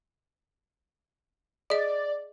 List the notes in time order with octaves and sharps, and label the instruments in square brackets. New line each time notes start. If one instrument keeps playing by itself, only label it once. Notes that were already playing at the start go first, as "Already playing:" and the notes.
[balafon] G#4 D#5 [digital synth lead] D5